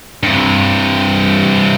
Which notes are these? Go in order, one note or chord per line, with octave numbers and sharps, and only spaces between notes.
G2 C3